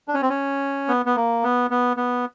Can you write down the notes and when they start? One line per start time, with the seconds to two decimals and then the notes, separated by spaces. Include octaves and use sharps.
0.08 D4
0.14 C#4
0.22 C4
0.30 C#4
0.88 B3
1.06 B3
1.16 A#3
1.44 B3
1.70 B3
1.97 B3